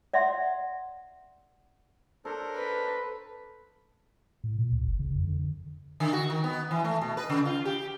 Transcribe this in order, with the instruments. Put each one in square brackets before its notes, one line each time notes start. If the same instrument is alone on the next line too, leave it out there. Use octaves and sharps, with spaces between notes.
[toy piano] D5 E5 F#5 C6
[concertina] D4 A#4 C5 [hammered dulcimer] A4 C#5
[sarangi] B4
[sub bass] A2
A#2
C#2
G1
C#3
F2
D3
[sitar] D3
F#4
D#3
B3
E3
A3
B2
B4
C#3
F4
G4